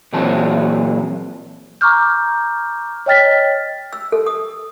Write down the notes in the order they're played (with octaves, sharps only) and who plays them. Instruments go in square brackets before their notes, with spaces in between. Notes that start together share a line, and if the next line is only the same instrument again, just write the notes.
[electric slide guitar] A#2 E3 F#3 C4 C5 A5
[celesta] A#5 C#6 D6 F6 G6
C#5 D#5 G5 F6 A6 B6
[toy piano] E6
A4
D#6